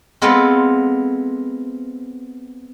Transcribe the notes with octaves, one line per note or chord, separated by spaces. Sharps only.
G#3 B3 C4 F4 A4